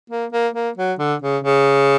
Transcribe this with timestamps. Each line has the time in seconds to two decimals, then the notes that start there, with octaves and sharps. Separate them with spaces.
0.10 A#3
0.32 A#3
0.54 A#3
0.77 F#3
0.99 D3
1.22 C#3
1.44 C#3